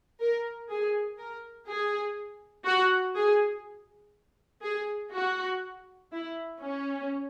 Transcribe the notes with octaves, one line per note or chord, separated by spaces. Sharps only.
A#4
G#4
A#4
G#4
F#4
G#4
G#4
F#4
E4
C#4